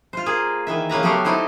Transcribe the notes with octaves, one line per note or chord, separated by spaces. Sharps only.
F4 C5
A#3 G#4
D#3 E3 E5
C#3 A#3 B4 A#5
F#3 A3 B3 G4 A4 F5
C4 D#4 E4 G4 C5